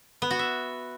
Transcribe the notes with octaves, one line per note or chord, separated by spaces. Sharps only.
B3
F#4
E5